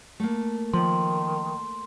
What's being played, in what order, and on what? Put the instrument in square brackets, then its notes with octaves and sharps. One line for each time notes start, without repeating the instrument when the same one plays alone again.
[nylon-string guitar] A3 A#3
[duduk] D#3 [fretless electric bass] F3 [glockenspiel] C6